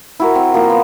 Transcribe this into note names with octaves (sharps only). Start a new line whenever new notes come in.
E4 F#4 A#4
C4
F3 A#3
B3